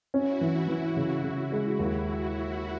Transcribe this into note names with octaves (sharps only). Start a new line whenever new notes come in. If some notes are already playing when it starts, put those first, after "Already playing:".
C#4 E4 F#4
E3
E3
C#3
C#3
G#3
D#2